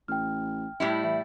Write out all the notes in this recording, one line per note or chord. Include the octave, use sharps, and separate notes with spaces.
A1 G5 F6
A2 G3 E4
E3 E5